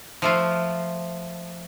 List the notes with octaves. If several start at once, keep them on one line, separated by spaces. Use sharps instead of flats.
F3 A3 F4